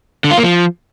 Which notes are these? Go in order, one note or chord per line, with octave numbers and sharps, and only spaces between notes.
D3
F4
A#3
F3